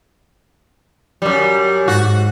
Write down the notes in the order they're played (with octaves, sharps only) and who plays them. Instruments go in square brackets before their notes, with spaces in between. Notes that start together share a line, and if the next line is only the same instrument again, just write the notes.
[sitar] F#2 G3
[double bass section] G#2 [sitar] F#4